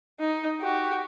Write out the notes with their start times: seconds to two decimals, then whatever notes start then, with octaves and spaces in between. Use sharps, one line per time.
0.19 D#4
0.60 F#4 G4